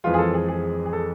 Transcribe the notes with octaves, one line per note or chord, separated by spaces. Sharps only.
F2 E3 G#3 F4
G#4
A4
G#4
G#4
G#4
A4